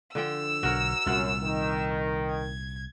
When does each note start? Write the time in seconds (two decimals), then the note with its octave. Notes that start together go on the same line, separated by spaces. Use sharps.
0.15 D3 F3 G5 E6
0.63 B1 D3 F#4 A#4 C#5
1.06 C2 F#2 A#2 F4 F#5
1.42 D#3
2.31 G#6